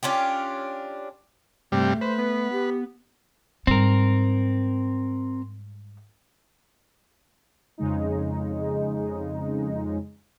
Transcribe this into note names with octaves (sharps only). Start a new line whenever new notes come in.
C#4 D4 F4 G4
G2 C3 G3 A3
B4 C5
B3
G4
G#2 G3 C4 A#4
F2 C#3 G#3 D#4